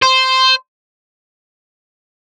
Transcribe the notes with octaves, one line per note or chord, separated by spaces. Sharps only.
C5